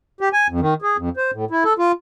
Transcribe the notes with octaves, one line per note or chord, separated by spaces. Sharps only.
G4
G#5
F2
D#3
G#4
F2
C5
A2
E4
A4
F4